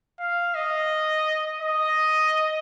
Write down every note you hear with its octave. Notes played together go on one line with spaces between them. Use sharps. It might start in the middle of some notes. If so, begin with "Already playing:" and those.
F5
D#5
D#5